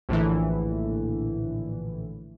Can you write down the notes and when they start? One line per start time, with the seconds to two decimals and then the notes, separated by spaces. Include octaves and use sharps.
0.09 A#1 A2 D3 E3